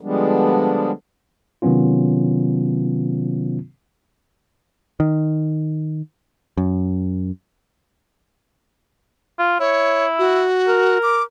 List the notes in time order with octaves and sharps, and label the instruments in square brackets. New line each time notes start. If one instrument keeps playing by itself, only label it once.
[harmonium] D3 F3 G3 G#3 B3 D4
[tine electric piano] C3 D#3 F#3 B3 C#4 F4
[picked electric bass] D#3
F#2
[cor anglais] F4
[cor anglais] E4 [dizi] C#5
[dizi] F#4
[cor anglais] A#4
[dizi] D6